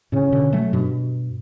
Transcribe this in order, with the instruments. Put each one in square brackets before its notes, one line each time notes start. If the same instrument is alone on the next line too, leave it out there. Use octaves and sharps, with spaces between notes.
[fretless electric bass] A2 C#3 [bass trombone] C#4
[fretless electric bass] B2 D3
F#3 A3
G2 B2